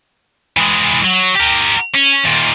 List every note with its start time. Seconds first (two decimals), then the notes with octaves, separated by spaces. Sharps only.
0.57 E3 G#3
1.04 F#3
1.35 G4 A#4
1.95 C#4
2.24 D#2 A#2